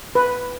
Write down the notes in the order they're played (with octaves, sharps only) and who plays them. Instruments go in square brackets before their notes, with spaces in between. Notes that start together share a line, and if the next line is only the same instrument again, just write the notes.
[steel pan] B4